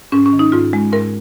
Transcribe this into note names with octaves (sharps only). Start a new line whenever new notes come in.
G#2 C#4
C#4
D#3
D#4
G#2 F4
G#3
G#2 A#4